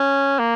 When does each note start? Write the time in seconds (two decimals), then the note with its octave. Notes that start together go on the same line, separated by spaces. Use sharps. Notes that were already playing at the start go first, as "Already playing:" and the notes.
Already playing: C#4
0.39 A#3